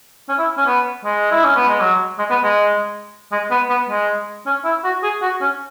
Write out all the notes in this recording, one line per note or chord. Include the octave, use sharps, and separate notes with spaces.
C#4
E4
C#4
B3
G#3
E4
C#4
B3
G#3
F#3
G#3
B3
G#3
G#3
B3
B3
G#3
C#4
E4
F#4
G#4
F#4
C#4